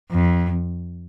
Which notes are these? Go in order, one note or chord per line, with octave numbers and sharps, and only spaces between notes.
F2